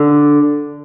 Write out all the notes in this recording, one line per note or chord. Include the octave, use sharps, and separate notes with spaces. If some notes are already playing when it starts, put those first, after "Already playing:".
Already playing: D3